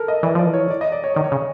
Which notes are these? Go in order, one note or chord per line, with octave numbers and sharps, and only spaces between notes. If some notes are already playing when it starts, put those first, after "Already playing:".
Already playing: A4 A#4
D#5
E3 D5
F3 D5
E3
C#5
D5
D#5
D5
C#5
D#3 D5
C#5
C#3